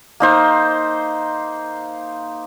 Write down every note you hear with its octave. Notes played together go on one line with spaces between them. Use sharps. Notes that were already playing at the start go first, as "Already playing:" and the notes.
A#3 D#4 C5